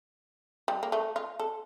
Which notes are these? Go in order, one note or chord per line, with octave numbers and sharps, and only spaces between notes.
G3
A#3
A3
F4
A4